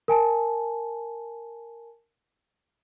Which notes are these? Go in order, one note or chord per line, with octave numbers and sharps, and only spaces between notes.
A#4 G#5 A5